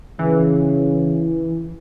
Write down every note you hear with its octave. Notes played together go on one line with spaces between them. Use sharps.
C#3 E3